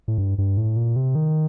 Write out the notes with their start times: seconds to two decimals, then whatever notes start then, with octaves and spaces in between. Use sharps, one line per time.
0.08 A2
0.18 G2
0.38 G2
0.57 A2
0.76 A#2
0.96 C3
1.15 D#3